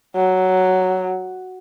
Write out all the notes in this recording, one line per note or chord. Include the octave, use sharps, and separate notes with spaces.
F#3